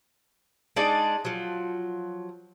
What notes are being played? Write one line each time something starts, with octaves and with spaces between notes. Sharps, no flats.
G#3 D4 D#4 D5
F3 F#3